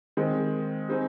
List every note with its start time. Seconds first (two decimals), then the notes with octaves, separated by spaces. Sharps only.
0.17 D#3 G#3 C4
0.88 G3 C4 D#4 G#4